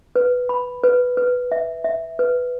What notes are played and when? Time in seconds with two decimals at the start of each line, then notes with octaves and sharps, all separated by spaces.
0.16 B4
0.49 B5
0.84 B4
1.17 B4
1.52 E5
1.84 E5
2.19 B4